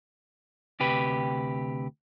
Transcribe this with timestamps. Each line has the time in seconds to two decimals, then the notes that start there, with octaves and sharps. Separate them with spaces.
0.80 D2 C3 G4 B4